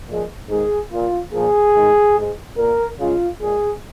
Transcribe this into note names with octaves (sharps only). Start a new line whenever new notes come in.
A#2 F3 G#3
G#2 D#3 G#3 G#4
A#2 A#3 F4
A#2 F3 A#3 G#4
G#2 D#3 G#3
G#2 G#3
A#2 A#3 A#4
C#3 G#3 F4
A#2 G#3 G#4